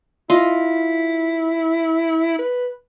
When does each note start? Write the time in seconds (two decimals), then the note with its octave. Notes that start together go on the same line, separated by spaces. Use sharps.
0.30 E4 F4 D#5
2.39 B4